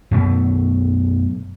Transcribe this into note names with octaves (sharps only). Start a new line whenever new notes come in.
F#2 B2 A3